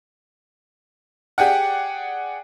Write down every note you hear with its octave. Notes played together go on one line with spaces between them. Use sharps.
G4 G#4 D5 F#5